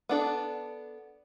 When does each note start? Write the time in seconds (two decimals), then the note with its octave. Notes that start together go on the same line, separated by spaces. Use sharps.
0.09 B3 D4 A4